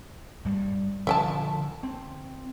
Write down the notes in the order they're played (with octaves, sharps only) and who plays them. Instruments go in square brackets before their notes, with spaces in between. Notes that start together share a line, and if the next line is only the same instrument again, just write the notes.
[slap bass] G2 G3
[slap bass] D3 F3 [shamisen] E5 G5 A5
[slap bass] C4